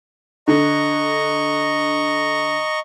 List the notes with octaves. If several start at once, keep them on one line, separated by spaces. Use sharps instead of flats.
D3 D#5 A#5 C#6